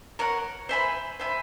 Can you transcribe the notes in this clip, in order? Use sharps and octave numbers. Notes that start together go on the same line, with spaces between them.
A#4 C#5 F#5
C5 E5 G#5 B5
C5 E5 G#5 B5